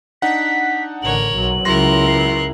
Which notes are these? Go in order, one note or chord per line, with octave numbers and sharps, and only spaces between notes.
D4 D#4 F#5 B6
A1 D3 A#4 C#5 F#7
B1 F#3
C#2 F#3 E4 A#4 C6 F#6 A#6
C7